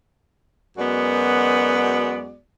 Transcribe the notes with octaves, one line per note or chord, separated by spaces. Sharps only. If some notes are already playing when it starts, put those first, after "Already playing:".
F#2 G#3 B3 F#4 D5